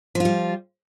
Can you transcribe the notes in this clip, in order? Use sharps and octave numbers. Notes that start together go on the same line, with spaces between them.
F3 G3 F4